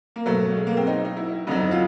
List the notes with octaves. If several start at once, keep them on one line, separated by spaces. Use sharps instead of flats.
A#3
B2 F#3 A3
G#3
A#3
C4
D#4
D#4
E4
F2 D3 F#3 D#4
F4